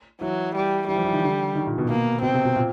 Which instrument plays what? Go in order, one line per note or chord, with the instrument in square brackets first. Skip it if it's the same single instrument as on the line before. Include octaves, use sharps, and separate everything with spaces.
[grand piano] E3 [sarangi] F#3
[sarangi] G3
[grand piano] E3 [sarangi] G3
[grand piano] F3
E3
D#3
D3
D#3
A#2
B2
[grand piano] B2 [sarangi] A#3
[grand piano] B2 [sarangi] C4
[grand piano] C3
B2
A#2